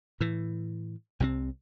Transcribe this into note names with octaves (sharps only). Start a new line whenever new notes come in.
A2 E3
C2 C3 G#3 C4